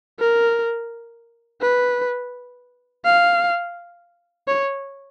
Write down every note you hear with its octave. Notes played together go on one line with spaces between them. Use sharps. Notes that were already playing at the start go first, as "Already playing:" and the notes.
A#4
B4
F5
C#5